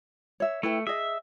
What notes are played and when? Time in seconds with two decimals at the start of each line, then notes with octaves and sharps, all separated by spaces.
0.40 C#5 E5
0.63 A3 E4 B4 G5
0.87 G#4 D#5 E5